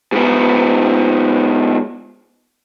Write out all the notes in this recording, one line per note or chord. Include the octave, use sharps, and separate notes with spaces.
G#2 B3